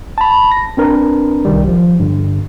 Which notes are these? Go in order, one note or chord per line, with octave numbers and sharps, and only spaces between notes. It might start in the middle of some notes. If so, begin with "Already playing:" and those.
A5 B5
A#6
C4 D4 A#4 B4
C2 D#3 G3
F3
G2 D3